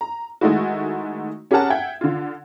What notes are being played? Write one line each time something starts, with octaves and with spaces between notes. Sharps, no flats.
A#5
D#3 G#3 A3 D#4 E4 F#4
C#4 G4 G#4 A#4 F#5 A5
E5 F#5 G5 G#6
D3 F4